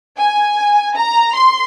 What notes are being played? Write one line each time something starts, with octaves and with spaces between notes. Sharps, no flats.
G#5
A#5
C6